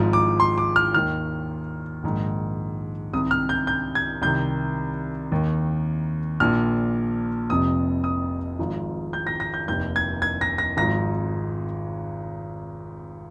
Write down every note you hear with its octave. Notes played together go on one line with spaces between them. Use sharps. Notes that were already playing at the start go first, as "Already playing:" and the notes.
Already playing: G#1 G#2 F3
D6
C6
D6
F6
D#2 D#3 F6
A#1 G#2 D#3
C2 C3 D#3 D#6
F6
G6
G6
G#6
C2 C3 D#3 G6
D#2 D#3
A#1 A#2 F3 F6
F1 F2 C3 D#6
D#6
G#1 G#2 F3
G6
A#6
A#6
G6
F1 D#2 D#3 G6
G#6
G#6
A#6
A#6
G#1 G#2 F3 A#6